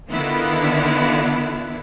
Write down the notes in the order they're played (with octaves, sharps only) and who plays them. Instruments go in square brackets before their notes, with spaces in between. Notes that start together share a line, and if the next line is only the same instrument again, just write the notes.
[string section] D3 D#3 B3 D4 E4 F4